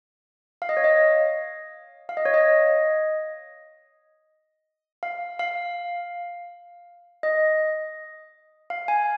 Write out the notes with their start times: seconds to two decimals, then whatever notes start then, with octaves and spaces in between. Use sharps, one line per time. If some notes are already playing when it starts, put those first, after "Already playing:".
0.62 F5
0.69 D#5
0.77 C#5
0.84 D#5
2.09 F5
2.17 D#5
2.25 C#5
2.34 D#5
5.03 F5
5.39 F5
7.23 D#5
8.70 F5
8.88 G#5